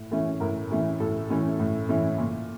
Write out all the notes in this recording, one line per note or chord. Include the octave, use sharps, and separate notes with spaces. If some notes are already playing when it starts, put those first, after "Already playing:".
Already playing: A2
E3 A3 C#4
A2 A#4
E3 A3 C#4
A2 A4
E3 A3 C#4
A2
E3 A3 C#4
A#2